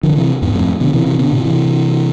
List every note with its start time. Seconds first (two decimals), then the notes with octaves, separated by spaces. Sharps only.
0.03 D3 F3
0.16 C3 E3
0.42 E2 G#2
0.55 F2 A2
0.80 B2 D3
0.93 C3 E3
1.06 C3 E3
1.19 B2 D3
1.32 A2 C3
1.45 C3 E3